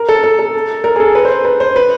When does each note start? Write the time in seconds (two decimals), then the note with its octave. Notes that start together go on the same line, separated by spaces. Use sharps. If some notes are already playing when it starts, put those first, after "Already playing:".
Already playing: A#4
0.09 A4
0.24 A4
0.39 A4
0.84 A#4
0.96 G#4
1.00 A4
1.15 B4
1.25 C5
1.45 B4
1.60 C5
1.76 B4